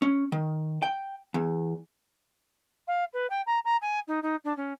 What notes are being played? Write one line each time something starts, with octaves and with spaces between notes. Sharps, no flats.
C#4
D#3
G5
E2
F5
B4
G5
A#5
A#5
G#5
D#4
D#4
D4
C#4